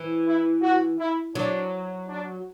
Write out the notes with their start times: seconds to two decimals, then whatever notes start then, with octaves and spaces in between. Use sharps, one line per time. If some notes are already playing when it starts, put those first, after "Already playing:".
Already playing: E3
0.26 E4
0.62 F#4
0.99 E4
1.35 F#3 D4
2.08 D4